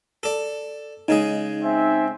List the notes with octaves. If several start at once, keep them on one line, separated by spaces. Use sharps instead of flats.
A4 D5
C#3 G#3 D#4 G#4
C4 E5 G#5